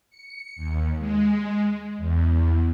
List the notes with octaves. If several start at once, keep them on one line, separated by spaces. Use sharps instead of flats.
C#7
D#2
G#3
E2